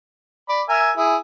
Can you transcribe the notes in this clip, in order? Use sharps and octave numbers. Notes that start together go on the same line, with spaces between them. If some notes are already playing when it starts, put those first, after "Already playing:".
D5 B5
A#4 E5 G#5
E4 G#4